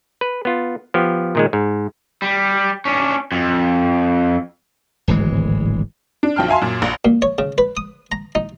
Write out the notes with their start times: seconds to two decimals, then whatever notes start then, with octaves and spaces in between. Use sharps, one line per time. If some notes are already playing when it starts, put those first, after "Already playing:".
0.21 B4
0.45 B3 F4
0.94 F3 B3 G4
1.35 A#2 D#3 G#3
1.53 G#2
2.22 G3
2.85 C#4 D4
3.32 F2
5.08 D1 G#1 E3 G#3
6.23 D4
6.36 B1 F3 G5 A5 F6
6.48 E5 F5 G#5 A5 C6
6.62 F#2 A#2
6.82 A#1
7.05 A#2
7.22 C#5
7.38 C#3
7.58 B4
7.77 D#6
8.12 A#5
8.35 D#4